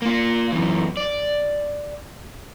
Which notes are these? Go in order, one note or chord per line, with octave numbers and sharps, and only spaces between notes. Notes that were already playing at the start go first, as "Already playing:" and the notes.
A#3 F4
F#2 E3
D5